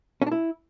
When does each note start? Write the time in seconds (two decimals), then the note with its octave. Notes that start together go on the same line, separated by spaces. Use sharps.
0.22 C#4
0.27 D4
0.32 E4